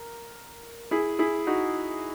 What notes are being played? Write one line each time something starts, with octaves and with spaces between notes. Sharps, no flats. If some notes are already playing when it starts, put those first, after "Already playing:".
Already playing: A#4
E4 G#4
E4 G#4
D#4 F#4